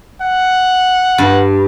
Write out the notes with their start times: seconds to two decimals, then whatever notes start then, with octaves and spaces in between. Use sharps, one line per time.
0.22 F#5
1.18 G2